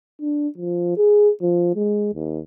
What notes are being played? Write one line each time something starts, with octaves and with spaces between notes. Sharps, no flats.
D4
F3
G#4
F3
G#3
D#2